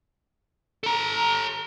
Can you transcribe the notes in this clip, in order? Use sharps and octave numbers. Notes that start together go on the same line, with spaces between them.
A4 A#5